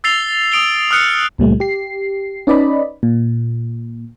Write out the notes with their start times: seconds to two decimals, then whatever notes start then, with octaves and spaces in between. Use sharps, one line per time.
0.04 E6 A6 C7 F7 G7
0.52 D#6 D7 F7 G7
0.91 D#6 F6 F#6 C#7
1.38 C#2 A#2 G3 A3
1.60 G4 C7
2.47 C#4 D#4 B4 D5 D#5 B5
3.03 A#2